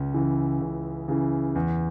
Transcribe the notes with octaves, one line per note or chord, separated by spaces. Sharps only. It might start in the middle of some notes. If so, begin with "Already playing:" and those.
Already playing: C#2
C#3 E3
C#2
C#3 E3
E2